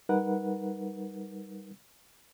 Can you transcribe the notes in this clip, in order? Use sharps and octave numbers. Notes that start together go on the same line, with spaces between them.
G3 D#4 A#4 B4 F#5